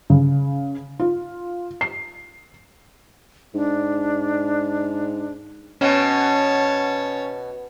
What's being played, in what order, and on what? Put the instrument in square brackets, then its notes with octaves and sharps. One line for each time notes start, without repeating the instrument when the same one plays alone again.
[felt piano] C#3
F4
C7
[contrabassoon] G#2 [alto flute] D4
[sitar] B2 [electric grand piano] C#4 [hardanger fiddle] C#5 A5